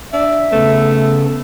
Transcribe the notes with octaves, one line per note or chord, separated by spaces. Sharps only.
D4 E5
C#3 A3 B3 A4